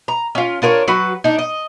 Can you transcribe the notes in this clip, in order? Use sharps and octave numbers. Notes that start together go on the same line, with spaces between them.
A#5
C#4 F4
D4 F4 A#4 C#5
F#3 F#4 B4
D4 D#4
D#5